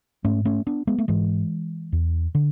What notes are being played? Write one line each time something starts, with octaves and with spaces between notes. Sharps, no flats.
G#2 A3 C#4
A3 C#4
B3 D4
G#3 B3
A3
G#2 E3 G#3
E2
D3